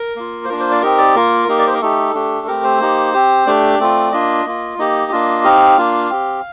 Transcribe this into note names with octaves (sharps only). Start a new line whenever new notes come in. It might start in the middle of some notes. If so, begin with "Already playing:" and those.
Already playing: A#4
A#3 F4
C5
A#3 D4 F4 A#4
C5
D5
C4 D#4 G4 A#4
D5
A#3 F4 A#4
A#3 D#4 G4
D5
C5
A#4
A3 D#4 G4 A4
A3 D4 G4
A3 C4 G4 A#4
C5
A#3 D#4 G4
C4 G4
A3 D4 G4 D5
A3 C4 F4
A#3 D4 F4 D#5
A#3 F4
A#3 D#4 G4 D#5
A#3 D4 F4
C4 D#4 G4 F5
A#3 D4 F4
C4 G4